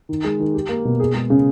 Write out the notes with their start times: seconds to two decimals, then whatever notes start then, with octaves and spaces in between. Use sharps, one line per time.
0.09 D#3
0.25 G#3
0.39 D#3
0.54 G4
0.69 A#3
0.85 B2
1.00 G#4
1.14 G#3
1.30 C#3